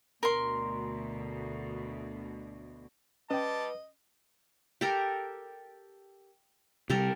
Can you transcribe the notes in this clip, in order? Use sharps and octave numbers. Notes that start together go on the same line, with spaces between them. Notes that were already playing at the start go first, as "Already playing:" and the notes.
D2 B2 A#4 C6
G3 C#4 B4 D5 D#5 G5 A5
G4 A4 A#4
C3 G3 G4 A4 A#4